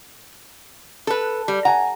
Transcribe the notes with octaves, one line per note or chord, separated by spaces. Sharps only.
A4 B4
G3
F#5 G#5 A#5